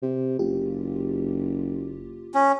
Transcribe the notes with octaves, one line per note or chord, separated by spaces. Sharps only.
C3
F#1 F4 G4
C#4